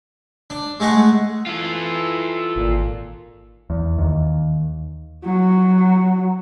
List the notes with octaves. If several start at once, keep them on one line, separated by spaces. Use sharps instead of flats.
D4
G#3 A3 D#5 F#5
E3 F4 A4
G#1 A#2
E2
D#2
F#3